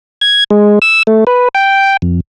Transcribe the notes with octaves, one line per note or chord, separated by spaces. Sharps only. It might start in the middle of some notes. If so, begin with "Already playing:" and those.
G#6
G#3
E6
A3
B4
G5
F2